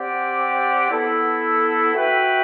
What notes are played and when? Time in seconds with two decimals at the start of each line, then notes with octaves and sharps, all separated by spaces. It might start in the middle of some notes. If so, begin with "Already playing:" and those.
Already playing: C4 G4 D5 F#5
0.91 B3 E4 A4
1.95 F#4 B4 E5 G5